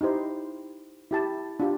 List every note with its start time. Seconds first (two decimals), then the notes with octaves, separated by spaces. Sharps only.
0.01 D#4 E4 G4 C5
1.11 E4 G4 A5
1.60 D4 F4 G4